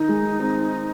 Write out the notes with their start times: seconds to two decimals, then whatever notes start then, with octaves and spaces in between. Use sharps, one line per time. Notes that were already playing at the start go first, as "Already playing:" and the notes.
Already playing: D#3 D#4
0.09 G#3
0.39 C4